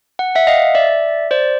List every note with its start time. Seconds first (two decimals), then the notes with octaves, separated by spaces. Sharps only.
0.19 F#5
0.35 E5 F#5
0.47 D#5 F5
0.75 D5 E5
1.31 C5 D5